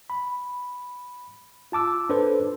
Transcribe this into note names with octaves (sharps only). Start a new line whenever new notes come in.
B5
F4 A5 D6 E6
D4 A4 B4 C5